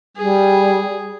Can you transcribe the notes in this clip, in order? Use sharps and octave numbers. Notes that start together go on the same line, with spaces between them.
G3 G#4